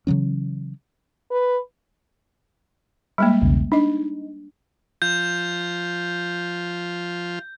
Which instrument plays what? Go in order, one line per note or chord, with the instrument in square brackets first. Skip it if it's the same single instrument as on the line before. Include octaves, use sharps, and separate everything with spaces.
[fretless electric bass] C#3 E3 F#3 C#4
[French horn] B4
[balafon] G3 G#3 A#3 [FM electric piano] B5
[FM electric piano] B1 E2 C#3
[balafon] D4 D#5 [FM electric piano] D#4
[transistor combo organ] F3 F4 [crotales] G6